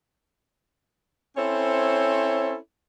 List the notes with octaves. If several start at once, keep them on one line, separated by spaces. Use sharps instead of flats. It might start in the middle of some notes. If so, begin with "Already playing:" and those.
C4 C#4 E4 A4 C5 C#5